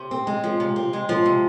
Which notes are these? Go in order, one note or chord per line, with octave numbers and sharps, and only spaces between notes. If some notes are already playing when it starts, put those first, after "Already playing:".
Already playing: C3
C4
G#3
F3
C3
C4
G#3
F3
C3